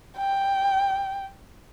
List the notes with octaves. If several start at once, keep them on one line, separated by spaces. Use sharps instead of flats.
G5